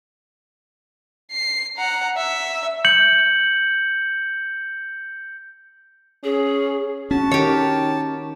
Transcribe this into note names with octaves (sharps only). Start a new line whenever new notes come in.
C7
F#5 A#5
E5
G6 C#7 F#7
C#4 G#4
C#4 F#4 A5
D#3 G4 A#4 C#5